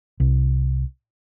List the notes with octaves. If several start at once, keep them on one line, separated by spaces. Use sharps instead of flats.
C2